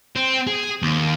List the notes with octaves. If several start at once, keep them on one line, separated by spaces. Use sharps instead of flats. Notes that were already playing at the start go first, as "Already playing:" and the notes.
C4
G#4
D#2